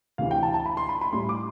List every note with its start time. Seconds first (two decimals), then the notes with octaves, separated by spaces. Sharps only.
0.18 D2 C3 E3 F5
0.31 G5
0.43 A5
0.54 A5
0.66 B5
0.77 C6
0.89 B5
1.01 B5
1.13 A2 G3 C6
1.29 D6